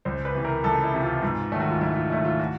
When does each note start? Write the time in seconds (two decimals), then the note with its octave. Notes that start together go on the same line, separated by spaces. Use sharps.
0.05 C#2 C5
0.25 B4
0.34 C3 E3
0.45 A#4
0.64 C#2 A4
0.83 E4
0.94 C3 E3
1.03 F4
1.22 G#2 F4
1.52 D#3 F#3 A3
1.60 F#4
1.71 F4
1.81 G#2 E4
1.95 F4
2.10 D#3 F#3 A3 E4
2.25 F4
2.39 F#4